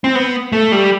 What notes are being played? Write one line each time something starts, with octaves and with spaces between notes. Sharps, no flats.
C4
B3
A3
G3